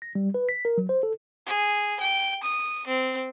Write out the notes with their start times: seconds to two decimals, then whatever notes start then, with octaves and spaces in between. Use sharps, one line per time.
0.02 A#6
0.15 G3
0.34 B4
0.49 B6
0.65 A#4
0.78 F#3
0.89 C5
1.03 A4
1.46 G#4
2.00 G5
2.43 D#6
2.87 C4